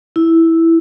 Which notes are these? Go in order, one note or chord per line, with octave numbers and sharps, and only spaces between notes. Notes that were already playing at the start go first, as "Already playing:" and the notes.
E4